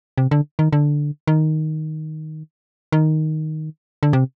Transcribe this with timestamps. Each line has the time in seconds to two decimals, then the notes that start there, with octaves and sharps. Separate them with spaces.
0.18 C3
0.31 D3
0.59 D#3
0.73 D3
1.27 D#3
2.92 D#3
4.03 D3
4.13 C3